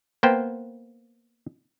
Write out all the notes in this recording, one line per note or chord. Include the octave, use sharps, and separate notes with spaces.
A#3 B3 C5 G5